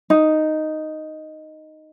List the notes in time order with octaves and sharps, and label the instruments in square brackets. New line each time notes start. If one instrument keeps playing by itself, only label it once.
[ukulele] D#4